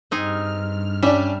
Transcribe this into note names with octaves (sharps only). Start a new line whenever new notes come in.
G2 C4 D#4 G#4 F6
G3 C#4 D4 E5